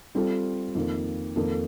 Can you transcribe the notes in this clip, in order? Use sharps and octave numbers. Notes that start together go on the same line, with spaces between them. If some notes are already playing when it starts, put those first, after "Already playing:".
G3 C4 F4 A4
F2 D#3 A#3
F2 D#3 A#3 D#4 A4